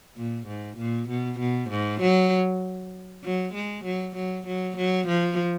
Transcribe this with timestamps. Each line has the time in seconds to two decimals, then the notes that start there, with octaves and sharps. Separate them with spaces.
0.17 A#2
0.47 G#2
0.78 A#2
1.09 B2
1.40 B2
1.70 G#2
2.01 F#3
3.24 F#3
3.54 G#3
3.85 F#3
4.16 F#3
4.47 F#3
4.77 F#3
5.07 F3